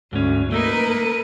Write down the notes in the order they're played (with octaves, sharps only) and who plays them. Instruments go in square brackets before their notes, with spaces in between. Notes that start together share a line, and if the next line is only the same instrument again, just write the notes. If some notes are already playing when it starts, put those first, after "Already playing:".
[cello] D2 [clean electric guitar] G#2 C#4
[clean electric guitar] A3 A#3 D#4 [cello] A#4 B4